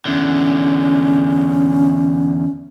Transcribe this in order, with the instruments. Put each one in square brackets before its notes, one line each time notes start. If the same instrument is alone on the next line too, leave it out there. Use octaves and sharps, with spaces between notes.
[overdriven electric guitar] E2 D3 [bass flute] C#4